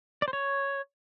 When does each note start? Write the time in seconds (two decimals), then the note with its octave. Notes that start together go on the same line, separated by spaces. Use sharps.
0.22 D5
0.28 C5
0.33 C#5